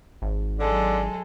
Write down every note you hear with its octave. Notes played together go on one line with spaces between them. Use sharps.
G#1
D3 F#3 G#3 A4